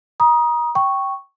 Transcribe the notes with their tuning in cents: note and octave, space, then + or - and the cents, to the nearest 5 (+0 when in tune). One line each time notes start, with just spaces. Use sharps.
A#5 +30 D#6 +0
G5 -10 C#6 -5